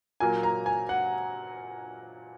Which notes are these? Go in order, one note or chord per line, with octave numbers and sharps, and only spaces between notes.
A#2 F#3 A#3 G#5
A#5
G#5
F#5